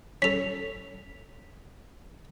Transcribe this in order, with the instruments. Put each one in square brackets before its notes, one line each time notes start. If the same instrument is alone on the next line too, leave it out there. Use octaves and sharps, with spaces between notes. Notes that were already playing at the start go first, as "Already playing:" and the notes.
[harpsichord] C#4 A4 [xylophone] B6 F7